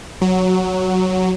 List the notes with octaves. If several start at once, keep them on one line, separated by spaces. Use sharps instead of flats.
F#3